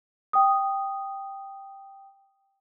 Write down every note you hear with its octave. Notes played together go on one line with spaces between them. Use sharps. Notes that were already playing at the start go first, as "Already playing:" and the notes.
G5 D#6